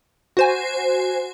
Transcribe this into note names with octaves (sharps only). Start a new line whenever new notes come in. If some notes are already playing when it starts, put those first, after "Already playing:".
F#4 C5 G#5